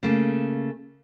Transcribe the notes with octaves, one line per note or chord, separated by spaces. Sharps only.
C#3 A3 A#3